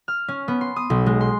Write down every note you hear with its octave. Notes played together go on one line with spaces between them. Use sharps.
F6
C#4
B3
C6
D#6
B1
G#3
C6